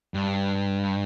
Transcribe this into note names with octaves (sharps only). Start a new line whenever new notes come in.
G2